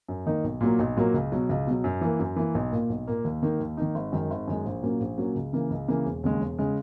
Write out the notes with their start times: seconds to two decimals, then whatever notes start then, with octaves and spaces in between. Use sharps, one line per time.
0.08 F#2
0.26 D#3 A#3 D#4
0.44 B1
0.61 A#2 F#3 A#3
0.79 B1
0.97 A#2 F#3 A#3
1.14 C#2
1.32 B2 F#3
1.49 C#2
1.67 B2 F#3
1.84 F#2
2.01 E3 A#3
2.19 F#2
2.36 E3 A#3
2.55 B1
2.71 A#2 A#3
2.90 B1
3.07 A#2 A#3
3.25 D#2
3.43 D#3 A#3 D#4
3.60 D#2
3.77 D#3 A#3 D#4
3.95 G#1
4.12 F#2 D#3 G#3
4.30 G#1
4.47 F#2 D#3 G#3
4.65 A#1
4.83 A#2 F#3 A#3 C#4
5.00 A#1
5.18 A#2 F#3 A#3 C#4
5.35 C#2
5.53 C#3 E3 A#3
5.70 C#2
5.88 C#3 E3 A#3
6.06 E1
6.24 D#2 C#3 G#3
6.41 E1
6.59 C#3 G#3